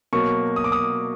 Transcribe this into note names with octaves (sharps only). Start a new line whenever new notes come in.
B2 F#3 A#3 C#6
D#6
D6
D#6